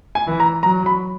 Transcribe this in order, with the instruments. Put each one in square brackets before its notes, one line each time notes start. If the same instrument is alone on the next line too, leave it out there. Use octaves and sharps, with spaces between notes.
[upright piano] G#5
[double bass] E3
[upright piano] A#5
[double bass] F#3 [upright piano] A#5
[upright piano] B5